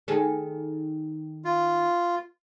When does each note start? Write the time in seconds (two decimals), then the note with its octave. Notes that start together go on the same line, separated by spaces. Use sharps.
0.08 D#3 G#4 A4
1.45 F4